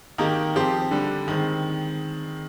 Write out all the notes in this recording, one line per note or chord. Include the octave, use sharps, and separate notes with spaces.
D#3 A#3 D#4 G4 A#4
F3 C4 G4 C5
D3 G3 D4
D#3 G#3 C4